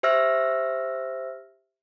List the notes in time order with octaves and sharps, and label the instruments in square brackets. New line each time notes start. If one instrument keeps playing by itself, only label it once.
[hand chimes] G4 C5 E5 E6 F6 A#6